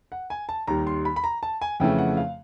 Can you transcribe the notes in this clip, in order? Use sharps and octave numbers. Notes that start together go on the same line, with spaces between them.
F#5
G#5
A5
D#2 D#3 G3 A#5
C6
B5
B5
A#5
A5
G#5
F2 C#3 E3 A3 G5
F#5
F5